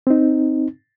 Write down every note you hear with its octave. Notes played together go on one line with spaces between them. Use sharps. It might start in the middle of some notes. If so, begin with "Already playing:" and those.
C4 D#4